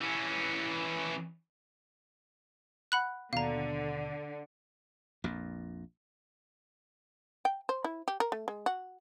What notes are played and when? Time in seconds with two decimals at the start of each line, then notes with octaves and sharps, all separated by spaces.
0.01 E3 C#4
2.92 F#5 B5 F#6
3.33 D#2 B2 D3 F5 A#5
5.24 A#1 F2 A#2
7.45 G5
7.69 C5
7.84 E4
8.08 G4
8.20 A#4
8.32 A3
8.48 G#3
8.66 F#4